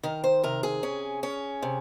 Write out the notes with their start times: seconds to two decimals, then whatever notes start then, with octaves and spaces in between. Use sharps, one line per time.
0.03 D#3 A#4
0.24 C5
0.43 C3 A#4
0.63 G#4
0.83 C#4
1.23 C#4
1.62 C3